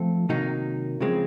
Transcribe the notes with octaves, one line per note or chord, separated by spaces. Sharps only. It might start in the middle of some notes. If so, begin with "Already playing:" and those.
Already playing: F3 A3 C4 F4 A4
C3 D#3 F#3 A#3 D#4
C#3 F3 G#3 C4